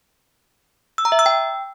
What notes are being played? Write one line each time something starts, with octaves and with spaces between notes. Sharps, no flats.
E6
A#5
E5
E6
G5